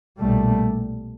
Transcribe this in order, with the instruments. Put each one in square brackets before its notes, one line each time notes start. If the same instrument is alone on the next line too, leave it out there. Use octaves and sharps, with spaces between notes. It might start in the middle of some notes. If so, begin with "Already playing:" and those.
[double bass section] B1 A#2 G3 A3